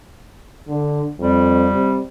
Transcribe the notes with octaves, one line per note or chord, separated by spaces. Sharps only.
D3
F2 G3
C3